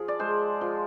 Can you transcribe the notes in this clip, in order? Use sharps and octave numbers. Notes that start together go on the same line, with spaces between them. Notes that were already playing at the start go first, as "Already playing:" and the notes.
Already playing: F3 G#4
D5
G#3 C5
F3